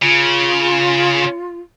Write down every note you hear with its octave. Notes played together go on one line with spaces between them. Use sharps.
C#3 F4